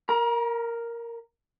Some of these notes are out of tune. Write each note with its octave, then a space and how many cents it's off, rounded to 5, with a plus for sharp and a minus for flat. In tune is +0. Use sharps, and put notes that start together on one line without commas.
A#4 +0 A#5 +40